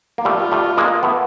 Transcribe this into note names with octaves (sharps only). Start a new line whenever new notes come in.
A#3
G3 A3 F4
G3 A3
G#3 A#3
A3 B3